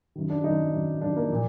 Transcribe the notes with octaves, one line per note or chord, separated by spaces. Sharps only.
F#2 D#3
D4
F#2 D#3 D#4
F#2 D#3
F#2 D#3 D4
A#3
A#2 F3